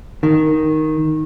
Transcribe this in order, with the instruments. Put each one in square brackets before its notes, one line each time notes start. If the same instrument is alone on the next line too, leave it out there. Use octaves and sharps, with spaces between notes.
[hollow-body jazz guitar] D#3